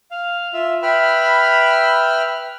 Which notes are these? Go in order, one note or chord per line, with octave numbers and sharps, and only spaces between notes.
F5
F4 E5
B4 E5 G5 B5 F6